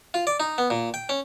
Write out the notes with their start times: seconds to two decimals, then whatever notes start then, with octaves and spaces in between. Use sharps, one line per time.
0.14 F4
0.27 D5
0.40 D#4
0.58 B3
0.70 A#2
0.94 G5
1.09 C#4